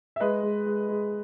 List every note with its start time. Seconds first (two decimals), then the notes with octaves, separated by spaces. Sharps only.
0.16 E5
0.20 G#3 B4 D#5
0.43 G#3
0.66 G#3
0.89 G#3